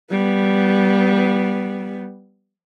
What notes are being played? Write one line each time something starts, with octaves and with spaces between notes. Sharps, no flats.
G3 B3